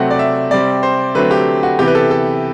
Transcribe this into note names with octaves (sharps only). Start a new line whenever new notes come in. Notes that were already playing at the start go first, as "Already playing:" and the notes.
Already playing: C3 F#3 A3 C4 F#5
D5
E5
C3 G3 C4 D5
C5
D3 F#3 A3 C4 B4
G4
F#4
C3 E3 B3 G4
B4
A4
A4